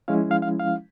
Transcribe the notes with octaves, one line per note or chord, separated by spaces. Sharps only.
F3 G#3 C#4 E4 F5
F5
F5
F5